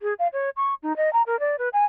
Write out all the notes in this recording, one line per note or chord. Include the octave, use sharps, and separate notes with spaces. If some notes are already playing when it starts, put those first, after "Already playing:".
G#4
F5
C#5
C#6
D#4
D#5
A#5
A#4
D5
B4
G#5